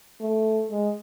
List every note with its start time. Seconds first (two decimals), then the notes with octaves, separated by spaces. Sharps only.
0.21 A3
0.71 G#3